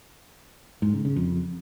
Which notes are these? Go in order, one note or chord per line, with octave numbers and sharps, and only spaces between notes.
G#2
C#3
C#3
F2